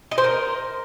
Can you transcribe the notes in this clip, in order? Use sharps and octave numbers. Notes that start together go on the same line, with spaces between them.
D#5
C5
A#4